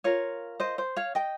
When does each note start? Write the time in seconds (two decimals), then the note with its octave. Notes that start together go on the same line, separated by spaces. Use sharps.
0.04 F4 A#4 C#5 F5
0.60 C5 D#5
0.78 C5
0.96 C#5 F5
1.15 D#5 G5